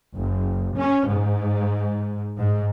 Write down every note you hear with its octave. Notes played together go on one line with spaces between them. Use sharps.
F#1
C#4
G#2
G#2